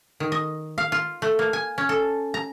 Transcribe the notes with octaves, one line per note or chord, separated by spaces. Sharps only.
D#3
D#5
F5
F4
A3
A#3
G#5
C#4
A4
A#5